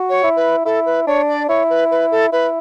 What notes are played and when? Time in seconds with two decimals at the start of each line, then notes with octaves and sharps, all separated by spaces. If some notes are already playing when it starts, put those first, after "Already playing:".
Already playing: F#4
0.09 C#5
0.23 E4
0.36 B4
0.65 E4 A4
0.86 B4
1.07 D4 C#5
1.28 D5
1.48 E4 C#5
1.70 B4
1.91 B4
2.11 A4
2.32 E4 B4